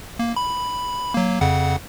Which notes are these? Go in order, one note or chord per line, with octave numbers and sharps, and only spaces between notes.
A#3
B5
F#3 A#3
F2 C#3 F#5